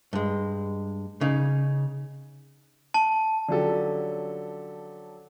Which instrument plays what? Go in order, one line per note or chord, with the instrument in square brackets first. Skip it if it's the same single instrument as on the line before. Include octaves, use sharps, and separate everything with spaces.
[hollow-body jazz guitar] G2 G#3
C#3 D#4
[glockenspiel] A5
[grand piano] D3 F3 F#3 C#4 G4 A4